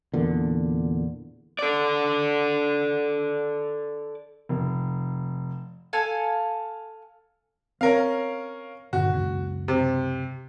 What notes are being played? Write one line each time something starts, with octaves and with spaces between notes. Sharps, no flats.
E2 A#2 D3
A4 D5
F1
A4 F5 G#5
C4 C#4 A#4 F5
G2 A#2 D3 F#4
C#2 F#2 C#3
C3